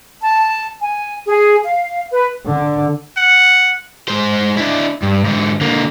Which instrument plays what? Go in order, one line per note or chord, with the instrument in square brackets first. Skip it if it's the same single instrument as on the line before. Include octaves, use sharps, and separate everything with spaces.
[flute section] A5
G#5
G#4
F5
B4
[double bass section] D3
[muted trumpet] F#5
[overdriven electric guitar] G#3 C5
D4 E4
G2
G#2 D3
D3 A#3